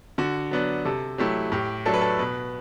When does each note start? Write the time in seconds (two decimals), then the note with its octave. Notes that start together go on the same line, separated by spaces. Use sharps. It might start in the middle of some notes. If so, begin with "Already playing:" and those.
0.18 D3 F#4
0.51 F#3 B3 D4
0.85 C3 A4
1.18 F#3 A3 E4 G4
1.52 A2 G4
1.86 F#3 A3 D4 A4
1.94 B4
2.01 A4
2.19 B2 B4